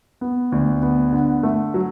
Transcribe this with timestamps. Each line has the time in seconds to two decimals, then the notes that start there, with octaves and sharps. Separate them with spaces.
0.21 B3
0.52 D2
0.82 B3
1.13 D3
1.43 A3
1.74 F#3